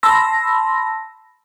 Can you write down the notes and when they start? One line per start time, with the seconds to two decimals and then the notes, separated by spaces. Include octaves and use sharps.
0.03 A5 B5 C6 E6 A#6